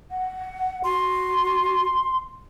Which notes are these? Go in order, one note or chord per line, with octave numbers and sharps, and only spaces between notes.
F#5
F#4 C6